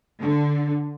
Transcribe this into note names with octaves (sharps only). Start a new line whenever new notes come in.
D3